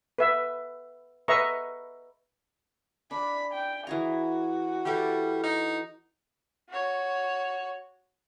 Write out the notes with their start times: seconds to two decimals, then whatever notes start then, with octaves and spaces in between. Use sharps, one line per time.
0.18 B4 E5
1.28 B4 D#5 E5 A#5 C#6
3.11 D4 B5
3.54 G5
3.87 E3 F#4 G#4 A#5
4.85 E3 G3 A4 D6
5.44 D#4
6.69 F#4 C#5